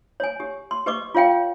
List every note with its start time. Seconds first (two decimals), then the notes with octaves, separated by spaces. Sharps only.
0.20 C#5 G#5
0.40 G4
0.71 C6
0.86 G4 B4 D#5 C#6 D6
1.15 F4 C#5 F5 G5